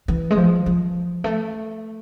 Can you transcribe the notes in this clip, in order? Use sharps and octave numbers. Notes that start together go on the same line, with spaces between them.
E3
G#3
F3
F3
A3